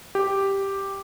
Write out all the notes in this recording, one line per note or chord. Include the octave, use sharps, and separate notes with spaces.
G4